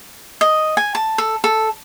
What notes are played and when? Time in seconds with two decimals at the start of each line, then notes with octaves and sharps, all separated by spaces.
0.41 D#5
0.77 G#5
0.95 A5
1.18 A4
1.44 A4